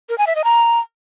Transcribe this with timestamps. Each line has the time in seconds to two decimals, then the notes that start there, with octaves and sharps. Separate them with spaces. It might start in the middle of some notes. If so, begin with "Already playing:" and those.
0.09 A#4
0.18 G#5
0.27 E5
0.35 D#5
0.44 A#5